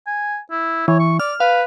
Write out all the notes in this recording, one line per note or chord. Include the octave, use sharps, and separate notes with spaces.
G#5
E4
E3 C#5
C#6
D5 F6
B4 F5